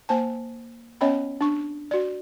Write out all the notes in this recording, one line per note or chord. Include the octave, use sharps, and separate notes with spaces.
A#3 C5 G#5 A5
B3 C#4 C#5 D#5 G5 B5
D4 C#6
F#4 D5